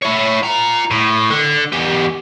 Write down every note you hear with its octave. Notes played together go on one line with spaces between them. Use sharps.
E4 C#5
F4 A#5
A2
D3
E2 G4